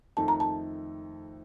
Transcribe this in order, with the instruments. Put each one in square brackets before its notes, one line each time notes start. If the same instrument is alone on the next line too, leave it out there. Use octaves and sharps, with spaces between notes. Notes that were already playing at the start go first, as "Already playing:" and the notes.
[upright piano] F2 D#3 A3 D#4 [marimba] A5
[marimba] A#5
A5